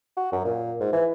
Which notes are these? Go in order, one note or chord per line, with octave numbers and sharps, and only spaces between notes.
F#4
F#2
A#2
G#2
E3